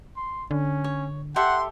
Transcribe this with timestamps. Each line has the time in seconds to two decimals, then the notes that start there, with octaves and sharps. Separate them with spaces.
0.17 C6
0.51 D3 C#4
0.84 C#5
1.36 G4 A4 E5 F#5 C6